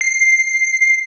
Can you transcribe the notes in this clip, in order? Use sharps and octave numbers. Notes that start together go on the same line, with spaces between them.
C7